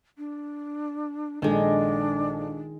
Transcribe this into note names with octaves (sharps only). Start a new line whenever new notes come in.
D4
A#1 D#3 G#3 D4 A4